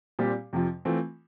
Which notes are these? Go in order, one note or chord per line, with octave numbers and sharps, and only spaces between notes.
A#2 G3 C4 G4
F2 C3 F3
E3 A3 C4 F4